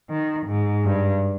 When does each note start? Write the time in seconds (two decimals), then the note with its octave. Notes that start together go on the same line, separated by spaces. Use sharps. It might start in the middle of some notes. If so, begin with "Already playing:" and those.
0.10 D#3
0.47 G#2
0.85 G2